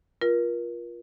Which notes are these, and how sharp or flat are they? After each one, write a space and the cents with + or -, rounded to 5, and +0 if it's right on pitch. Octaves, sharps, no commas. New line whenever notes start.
F4 +0 A#4 +35